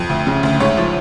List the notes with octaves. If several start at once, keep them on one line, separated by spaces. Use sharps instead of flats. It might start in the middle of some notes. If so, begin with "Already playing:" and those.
Already playing: F2
D2
C#3
D2
G#2 C#5
F3